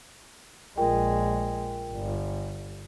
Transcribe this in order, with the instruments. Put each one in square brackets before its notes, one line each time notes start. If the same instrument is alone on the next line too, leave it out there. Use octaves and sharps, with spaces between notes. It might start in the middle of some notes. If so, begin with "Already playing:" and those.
[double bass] A#1 G#3 [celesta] F4 A#4 G5
[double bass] G1